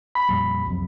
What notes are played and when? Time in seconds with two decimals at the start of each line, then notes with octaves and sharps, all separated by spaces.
0.15 B5
0.29 F2 A#2 G3
0.66 C2 F2 F#3